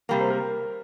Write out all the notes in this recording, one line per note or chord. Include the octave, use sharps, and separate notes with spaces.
C3 G3 A#3
C5
A#4